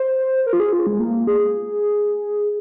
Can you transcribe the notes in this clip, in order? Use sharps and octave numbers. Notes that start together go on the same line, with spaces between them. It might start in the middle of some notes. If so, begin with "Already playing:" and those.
Already playing: C5
A#4
F4
G#4
F4
G#3
A#3
G#4